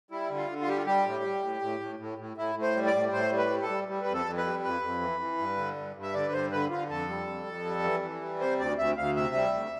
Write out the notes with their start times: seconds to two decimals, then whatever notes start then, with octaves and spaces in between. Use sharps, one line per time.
0.11 G3 E4
0.30 D3
0.37 F4
0.49 D3
0.61 F4
0.67 G3 G4
0.77 F4
0.86 G3 G4
1.05 A2
1.23 G3
1.43 A2
1.61 A2
1.80 A2
1.99 A2
2.18 A2
2.37 A2 E4
2.55 A2
2.62 C5
2.75 G3
2.87 D5
2.94 A2
3.12 A2 C5
3.31 G3
3.38 B4
3.50 G3
3.62 A4
3.69 G3
3.88 G3
4.02 B4
4.07 F2
4.14 A4
4.26 F2
4.38 B4
4.45 G3
4.63 F2 B4
4.82 F2
5.01 E3
5.20 E3
5.38 G2
5.57 D3
5.77 G2
5.96 G2
6.03 E5
6.14 D3 D5
6.25 B4
6.32 G2 C5
6.52 D3 B4
6.70 D3 F4
6.89 F2 A4
7.08 G3
7.27 F2
7.47 F2
7.65 G3
7.84 E3
8.02 E3
8.21 G3
8.40 C3 C5
8.59 D2 D5
8.78 D2 E5
8.97 D2 F5
9.16 C3 E5
9.35 G3
9.53 D2